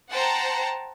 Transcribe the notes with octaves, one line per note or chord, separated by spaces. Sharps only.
C5 F#5 G5 A5 A#5